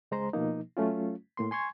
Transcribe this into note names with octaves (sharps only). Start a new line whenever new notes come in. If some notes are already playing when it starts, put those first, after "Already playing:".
C#2 G#3 C5 A#5 C6
B2 F3 A#3 D#4
F#3 A3 C#4 F4
A2 A#3 C6
G#5 C6 C#6 G#6